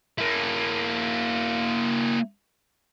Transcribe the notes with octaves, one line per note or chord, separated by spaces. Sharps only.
A#3 E4